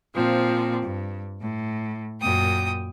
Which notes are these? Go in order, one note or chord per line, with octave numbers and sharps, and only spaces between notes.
A#2 F3 C4
G2
A2
F#2 A#2 G5 D#6